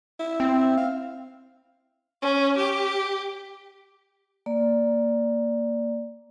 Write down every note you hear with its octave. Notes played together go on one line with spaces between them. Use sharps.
E4
C4
F5
C#4
G4
A#3 D5